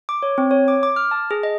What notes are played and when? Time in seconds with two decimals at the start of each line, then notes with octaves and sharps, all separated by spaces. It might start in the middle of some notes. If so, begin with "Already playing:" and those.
0.09 D6
0.23 C#5
0.38 C4
0.51 C#5
0.68 D6
0.83 D6
0.96 F6
1.11 A5
1.31 G#4
1.43 D#5